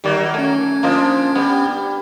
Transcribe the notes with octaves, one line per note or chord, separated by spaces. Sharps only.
D#3 F#3 G3 A#3 D5
A3 C#4 G#6
F3 A#3 D4 F4 D#5
G3 B3